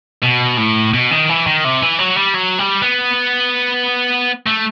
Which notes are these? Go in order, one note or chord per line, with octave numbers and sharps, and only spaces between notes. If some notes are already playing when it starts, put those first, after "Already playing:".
B2
A2
B2
D#3
E3
D#3
C3
E3
F#3
G3
F#3
G3
B3
A3